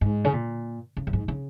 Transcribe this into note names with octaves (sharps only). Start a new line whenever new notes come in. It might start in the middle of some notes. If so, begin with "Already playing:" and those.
G#2
C#3
A#2
C#3
F#2
G#2
C#3